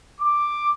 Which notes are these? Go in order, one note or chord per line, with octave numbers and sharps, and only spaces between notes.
D6